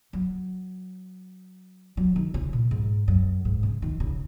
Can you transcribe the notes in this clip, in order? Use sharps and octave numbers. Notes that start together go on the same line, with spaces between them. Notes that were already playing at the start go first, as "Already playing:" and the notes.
F#3
F#3
D#3
C#3
A#2
G#2
F#2
G#2
C#3
D#3
C#3